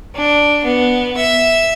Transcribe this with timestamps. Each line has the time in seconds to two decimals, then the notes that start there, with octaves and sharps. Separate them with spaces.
0.15 D4
0.64 B3
1.17 E5